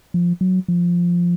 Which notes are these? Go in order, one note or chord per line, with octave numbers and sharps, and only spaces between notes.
F3
F#3
F3